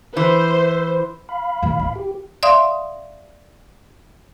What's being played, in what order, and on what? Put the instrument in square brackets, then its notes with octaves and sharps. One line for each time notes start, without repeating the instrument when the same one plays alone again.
[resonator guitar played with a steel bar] E3 [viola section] C5
[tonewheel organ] F5 B5
[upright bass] A1 D#2
E4
[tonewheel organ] G4
[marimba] D5 E5 F5 C6 D#6